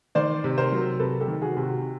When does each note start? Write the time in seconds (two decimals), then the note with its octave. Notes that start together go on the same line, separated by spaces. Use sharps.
0.15 D#3 C5 D5
0.44 C3
0.58 A#4 C5
0.72 F#3
1.00 C3 A4 B4
1.20 G4 A4
1.28 D#3
1.42 F#4 G#4
1.57 C3
1.63 F#4